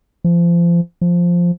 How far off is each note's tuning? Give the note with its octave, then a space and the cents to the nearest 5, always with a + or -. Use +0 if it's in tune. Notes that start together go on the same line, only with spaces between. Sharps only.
F3 -30
F3 +0